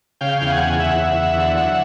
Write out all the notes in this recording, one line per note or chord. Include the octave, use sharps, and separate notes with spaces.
C#3 F5 G5
E2
F#5 G#5
C#3
E2 E5 F#5
E2
E2
D3
F#3